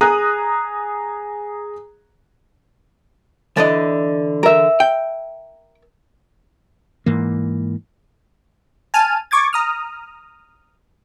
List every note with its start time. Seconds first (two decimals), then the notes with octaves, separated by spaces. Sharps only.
0.01 G#4 A#5 D#6 F#6
3.57 D3 E3 D4 D#5
4.43 A#4 E5
4.80 G5
7.06 G#2 E3 A#3
8.94 G#5 A5 F6 D#7
9.31 C#6 D6 G#6 A6
9.53 A#5 D#6 F6